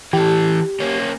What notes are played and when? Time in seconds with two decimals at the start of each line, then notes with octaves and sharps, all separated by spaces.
0.13 E3 G4 A4
0.80 A#3 C#4